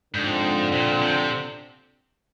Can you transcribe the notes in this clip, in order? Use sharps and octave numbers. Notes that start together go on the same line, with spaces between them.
G#2 D3 F3 C4
A#2
C3